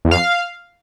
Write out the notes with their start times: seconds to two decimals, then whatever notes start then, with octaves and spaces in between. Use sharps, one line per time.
0.05 E2
0.11 F2 F5